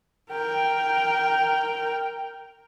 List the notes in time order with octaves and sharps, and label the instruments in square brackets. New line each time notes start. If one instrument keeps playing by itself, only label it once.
[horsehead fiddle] A#4 G5